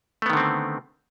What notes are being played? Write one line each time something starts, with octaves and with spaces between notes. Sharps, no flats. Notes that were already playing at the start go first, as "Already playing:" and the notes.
D3 D#3 A3 B3 C4